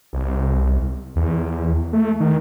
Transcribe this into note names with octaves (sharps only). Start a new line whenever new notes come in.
C2
E2
A3
D#3